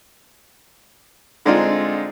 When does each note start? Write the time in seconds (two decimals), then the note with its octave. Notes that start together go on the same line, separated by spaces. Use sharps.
1.45 D3 G#3 C4 D4 D#4 F4